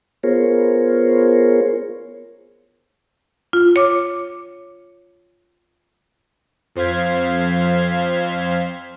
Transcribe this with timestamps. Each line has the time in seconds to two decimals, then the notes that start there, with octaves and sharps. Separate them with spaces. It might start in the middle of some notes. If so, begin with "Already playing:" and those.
0.23 B3 F4 G#4 A#4 C5 C#5
3.53 F4
3.76 C#5 D6
6.75 F2 C5 F5 G#6 B6